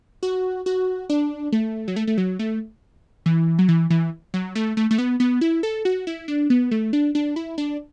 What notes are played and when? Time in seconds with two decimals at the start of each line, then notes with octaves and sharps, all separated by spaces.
0.23 F#4
0.66 F#4
1.10 D4
1.52 A3
1.88 F#3
1.96 A3
2.07 A3
2.18 F#3
2.39 A3
3.26 E3
3.59 F#3
3.69 E3
3.90 E3
4.34 F#3
4.55 A3
4.77 A3
4.91 A3
4.98 B3
5.20 B3
5.41 E4
5.63 A4
5.85 F#4
6.07 E4
6.28 D4
6.50 B3
6.71 A3
6.93 D4
7.15 D4
7.36 E4
7.58 D4